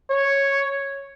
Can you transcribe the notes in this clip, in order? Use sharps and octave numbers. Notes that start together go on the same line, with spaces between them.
C#5